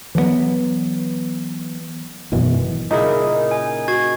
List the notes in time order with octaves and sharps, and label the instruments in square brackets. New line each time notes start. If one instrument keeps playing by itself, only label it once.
[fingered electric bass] E3 F#3 G#3 B3
G#1 F#2 B2 E3
[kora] A#2 C#3 E4 [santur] D#4 [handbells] A#4
[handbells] G#5
F#4 G#6